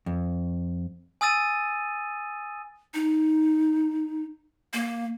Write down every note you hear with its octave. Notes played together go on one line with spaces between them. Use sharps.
F2
G#5 D#6 E6 A6 D#7
D#4
A#3